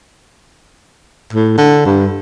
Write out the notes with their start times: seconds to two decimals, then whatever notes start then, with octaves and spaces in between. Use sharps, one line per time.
1.33 A2
1.58 D3
1.86 G2